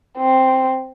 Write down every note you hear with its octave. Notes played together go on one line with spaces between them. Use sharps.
C4